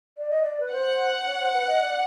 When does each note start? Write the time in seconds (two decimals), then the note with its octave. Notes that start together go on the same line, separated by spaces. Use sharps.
0.17 D5
0.30 D#5
0.43 D5
0.60 B4
0.72 C5 F#5
1.27 C#5
1.40 C5
1.54 B4
1.68 D#5
1.81 D5